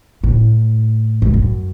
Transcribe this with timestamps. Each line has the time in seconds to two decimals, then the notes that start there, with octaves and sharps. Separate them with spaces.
0.24 A2
1.22 G#2
1.34 F#2